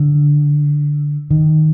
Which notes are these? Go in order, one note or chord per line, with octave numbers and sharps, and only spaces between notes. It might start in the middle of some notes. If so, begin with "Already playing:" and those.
Already playing: D3
D#3